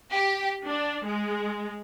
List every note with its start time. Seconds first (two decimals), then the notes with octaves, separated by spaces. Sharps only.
0.14 G4
0.66 D4
1.04 G#3